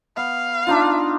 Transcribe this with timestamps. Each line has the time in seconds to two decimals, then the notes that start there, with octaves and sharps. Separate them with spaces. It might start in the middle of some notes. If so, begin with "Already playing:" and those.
0.17 B3 F5
0.67 D4 D#4 F4